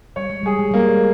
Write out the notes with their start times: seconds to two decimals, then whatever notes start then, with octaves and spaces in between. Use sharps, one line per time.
0.16 G3 C#5
0.30 G#3
0.43 G3 G#4
0.59 G#3
0.71 G3 A#3
0.82 G#3